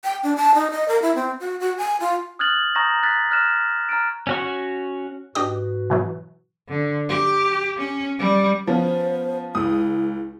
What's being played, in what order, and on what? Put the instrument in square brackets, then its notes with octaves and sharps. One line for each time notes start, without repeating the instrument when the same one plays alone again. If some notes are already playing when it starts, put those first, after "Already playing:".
[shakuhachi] G5
D4
A5
D#4
D#5
A#4
E4
C4
F#4
F#4
G#5
F4
[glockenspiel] D#6 F6 F#6 G#6 A6 F#7
A#5 C#6 D#6 G6 A6 A#6
F#6 A6 B6
F6 F#6 G#6 A#6 E7
A#5 F6 A6 D7
[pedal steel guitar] C#4 F#4 C#6
[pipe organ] G#2 F#4 B4 [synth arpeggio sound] D4 G4 D#5
[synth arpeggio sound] B2 E3 F#3
[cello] D3
G4
C#4
G3
[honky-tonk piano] F3 B3 C#4 [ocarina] C5
[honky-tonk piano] C#2 D#6 [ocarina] E4